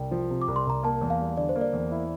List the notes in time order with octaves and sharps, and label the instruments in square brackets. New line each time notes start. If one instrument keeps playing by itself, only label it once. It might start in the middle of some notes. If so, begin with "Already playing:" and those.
Already playing: [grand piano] C2 [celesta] G5
[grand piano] F3
C3
[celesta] D6
[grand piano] C2
[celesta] C6
[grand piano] C2 [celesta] A#5
[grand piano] A#3 [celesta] A5
[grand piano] E2
[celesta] F5
[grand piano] G3
[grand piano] D3 [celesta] D5
[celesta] C5
[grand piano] A#3
[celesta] D5
[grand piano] E2
E4